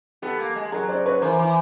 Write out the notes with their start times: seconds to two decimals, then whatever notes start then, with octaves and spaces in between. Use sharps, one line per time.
0.22 B3 G4 A4
0.39 A#3
0.56 G#3
0.72 F#3 G#4 A#4
0.89 C5 D5
1.06 B4 C#5
1.22 E3 A#4 C5
1.39 E3